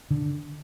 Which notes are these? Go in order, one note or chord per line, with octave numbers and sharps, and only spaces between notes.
D3